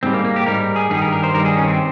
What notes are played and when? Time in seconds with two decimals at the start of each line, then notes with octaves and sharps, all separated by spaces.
0.03 G#2 G3 C4
0.13 A#3
0.25 A#3
0.36 G4
0.46 G#2 G3 A#4
0.76 G#4
0.90 G2 D#3 G3 G#4
1.02 A#4
1.13 A#4
1.23 C5
1.34 G2 D#3 G3 A#4
1.45 G#4
1.56 C#4
1.67 C4